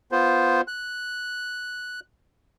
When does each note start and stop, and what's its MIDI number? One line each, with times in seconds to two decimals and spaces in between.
0.12 0.61 59
0.12 0.61 65
0.12 0.61 72
0.68 2.00 90